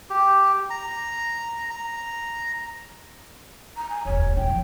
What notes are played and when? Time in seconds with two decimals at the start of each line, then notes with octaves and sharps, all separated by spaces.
0.10 G4
0.70 A#5
1.70 A#5
3.77 A#5
3.90 G#5
4.05 E1 D2 C#5
4.37 F2 D#4 G5
4.49 E2 F3